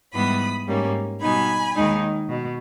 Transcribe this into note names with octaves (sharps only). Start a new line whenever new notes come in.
G#2 E3 G3 B3 B5 D#6
G#2 G3 A#3 C#4
B2 G3 B3 D#4 G#5 B5
D#2 D#3 G#3 D#4
B2